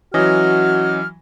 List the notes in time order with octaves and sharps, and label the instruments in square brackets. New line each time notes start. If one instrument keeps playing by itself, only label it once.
[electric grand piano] E3 F#3 [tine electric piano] C#4 D#5 [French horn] F#4 [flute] F6